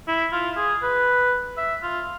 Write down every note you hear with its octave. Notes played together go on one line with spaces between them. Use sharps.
E4
F4
G#4
B4
E5
F4